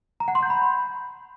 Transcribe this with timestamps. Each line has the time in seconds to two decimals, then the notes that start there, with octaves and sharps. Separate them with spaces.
0.20 A#5
0.28 F#5
0.35 C6
0.43 G6
0.50 B5